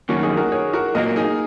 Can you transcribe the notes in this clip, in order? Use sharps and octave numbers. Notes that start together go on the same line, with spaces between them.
F#2 D#3 A#3 C#4 F#4
D#4 G#4
F#4 A#4
G#4 C#5
F#4 A#4
A#2 F#3 A#3 A#4 D#5
D#4 G#4